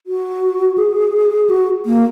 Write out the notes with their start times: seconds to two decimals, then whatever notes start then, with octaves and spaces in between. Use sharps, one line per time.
0.07 F#4
0.78 G#4
1.50 F#4
1.86 A#3